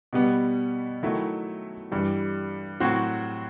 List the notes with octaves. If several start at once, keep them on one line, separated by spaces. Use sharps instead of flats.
B2 G3 B3
D#3 F#3 A3 E4
G2 E3 G3
A2 F#3 C4 F#4